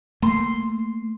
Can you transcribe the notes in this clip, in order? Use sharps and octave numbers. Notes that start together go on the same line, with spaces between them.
A3 A#3 C6